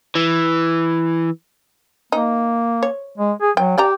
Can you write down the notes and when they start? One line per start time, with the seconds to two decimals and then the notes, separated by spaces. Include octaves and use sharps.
0.15 E3
2.12 A#3 D#4
2.83 C#5
3.17 G#3
3.41 G#4
3.57 F#3 G5
3.78 G4 D5 G5 A#5